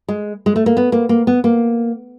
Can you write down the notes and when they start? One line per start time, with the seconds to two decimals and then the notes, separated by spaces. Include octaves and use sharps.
0.08 G#3
0.46 G#3
0.56 A3
0.66 A#3
0.77 B3
0.92 A#3
1.09 A#3
1.27 B3
1.44 A#3